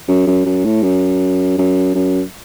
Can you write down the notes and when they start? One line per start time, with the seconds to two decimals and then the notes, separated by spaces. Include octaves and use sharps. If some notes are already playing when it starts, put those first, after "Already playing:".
0.08 F#2
0.27 F#2
0.45 F#2
0.65 A2
0.83 F#2
1.58 F#2
1.95 F#2